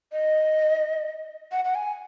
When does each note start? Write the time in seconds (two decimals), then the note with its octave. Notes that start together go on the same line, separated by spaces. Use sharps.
0.12 D#5
1.52 F#5
1.65 F#5
1.75 G#5